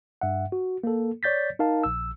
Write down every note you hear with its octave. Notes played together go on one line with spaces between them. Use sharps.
G2 E5 F#5
F#4
A#3 A4
C#5 D5 G6 A6 B6
D#4 A#4 F5 A5
A#1 E6